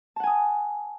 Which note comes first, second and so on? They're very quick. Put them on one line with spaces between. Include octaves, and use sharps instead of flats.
A5 F#5 G#5 D#6